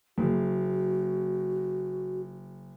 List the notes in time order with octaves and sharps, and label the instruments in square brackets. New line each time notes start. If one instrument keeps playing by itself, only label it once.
[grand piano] F#1 [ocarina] F#4